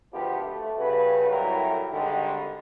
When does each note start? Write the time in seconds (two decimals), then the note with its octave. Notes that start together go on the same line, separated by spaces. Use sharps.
0.13 G#1 D2 F3 B3 G4
0.43 A3
0.78 G2 C#3 F#4 B4
1.29 C2 A2 F#3 G3 A#4
1.92 G#1 D3 D#3 G3 G#3